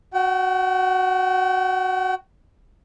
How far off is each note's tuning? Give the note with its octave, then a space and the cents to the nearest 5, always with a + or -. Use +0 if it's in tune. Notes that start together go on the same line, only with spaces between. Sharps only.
F#4 +0 G5 -40